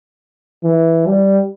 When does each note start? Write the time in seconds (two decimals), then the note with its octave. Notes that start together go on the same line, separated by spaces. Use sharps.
0.64 E3
1.08 G3